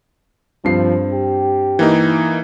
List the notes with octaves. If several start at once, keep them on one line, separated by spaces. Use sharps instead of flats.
G2 F3 C4 C7
G4
E3 A#3 D#4